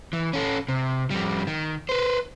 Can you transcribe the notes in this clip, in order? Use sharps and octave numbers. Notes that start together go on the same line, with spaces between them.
E3
C#4 A4
C3
F2 G3
D#3
B4 C5